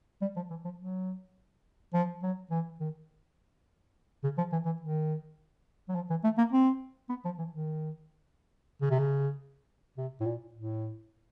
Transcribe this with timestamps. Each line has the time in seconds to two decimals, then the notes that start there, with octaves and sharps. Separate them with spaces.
0.22 G3
0.36 F3
0.50 E3
0.65 F3
0.79 F#3
1.94 F3
2.23 F#3
2.51 E3
2.80 D#3
4.24 C#3
4.38 F3
4.52 E3
4.66 E3
4.81 D#3
5.89 F#3
5.95 F3
6.10 E3
6.24 A3
6.38 A#3
6.52 C4
7.09 B3
7.25 F3
7.39 E3
7.53 D#3
8.82 C#3
8.90 C3
8.99 C#3
9.98 C3
10.21 A2
10.26 A#2
10.55 A2